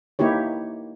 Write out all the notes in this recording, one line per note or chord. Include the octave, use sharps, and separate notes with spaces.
A#3 D#4 E4 G4 C#5